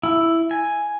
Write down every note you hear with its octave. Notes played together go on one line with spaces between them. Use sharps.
E4
G#5